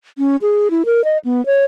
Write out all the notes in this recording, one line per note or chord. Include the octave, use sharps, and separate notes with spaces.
C#4
G#4
E4
A#4
D#5
B3
C#5